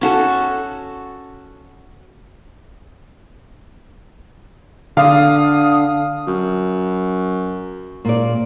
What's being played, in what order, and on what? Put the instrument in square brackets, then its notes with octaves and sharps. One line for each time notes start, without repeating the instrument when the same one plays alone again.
[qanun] C#4 F#4 A4
[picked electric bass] D3 [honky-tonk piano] F5 [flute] D#6
[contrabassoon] F#2
[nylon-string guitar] A#2 D5